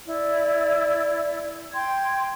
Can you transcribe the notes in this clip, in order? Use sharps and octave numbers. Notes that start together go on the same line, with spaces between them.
E4 D5
G5 C6 G#6